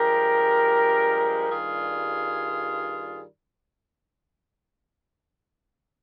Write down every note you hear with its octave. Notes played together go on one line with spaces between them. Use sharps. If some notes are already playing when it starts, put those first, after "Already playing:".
Already playing: G2 F3 G#3 G4 A#4
G2 D#3 G3 F4 G#4